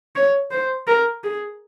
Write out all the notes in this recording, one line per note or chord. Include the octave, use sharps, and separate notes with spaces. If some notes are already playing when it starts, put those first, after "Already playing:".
C#5
C5
A#4
G#4